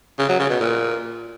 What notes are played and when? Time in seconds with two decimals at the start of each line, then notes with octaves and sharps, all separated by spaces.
0.19 C#3
0.29 F#3
0.39 C#3
0.50 B2
0.60 A#2